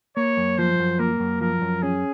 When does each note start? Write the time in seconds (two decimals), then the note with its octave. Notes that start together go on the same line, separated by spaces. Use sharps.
0.17 A#3 C#5
0.37 F#2
0.58 F3 C5
0.79 F#2
0.99 A#3 A#4
1.20 F#2
1.41 F3 A#4
1.62 F#2
1.82 C#4 G#4